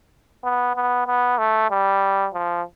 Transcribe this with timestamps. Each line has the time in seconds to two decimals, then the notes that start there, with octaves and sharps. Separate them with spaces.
0.44 B3
0.75 B3
1.07 B3
1.38 A3
1.71 G3
2.34 F3